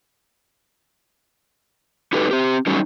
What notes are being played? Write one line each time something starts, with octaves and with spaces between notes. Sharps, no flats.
D#4 F#4 G4 A4 B4
C4 G4
F#3 G3 A3 C#4 D#4 F#4